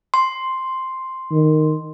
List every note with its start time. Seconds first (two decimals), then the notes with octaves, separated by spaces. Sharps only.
0.14 C6
1.32 D#3